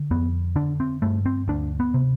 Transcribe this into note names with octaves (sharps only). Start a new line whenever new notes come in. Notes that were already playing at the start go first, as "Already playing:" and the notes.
Already playing: D3
F2 B3
D3 D4
C4
G2 A3
C4
D2 D4
B3
C3